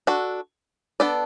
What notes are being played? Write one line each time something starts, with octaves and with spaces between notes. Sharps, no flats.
D4 F#4 A4
B3 D4 A4 D5